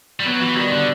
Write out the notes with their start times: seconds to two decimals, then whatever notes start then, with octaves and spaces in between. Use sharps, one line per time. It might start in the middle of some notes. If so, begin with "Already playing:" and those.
0.20 G3
0.25 F#3 B3
0.41 E3 F#4
0.56 D#3 G3
0.72 D3 D4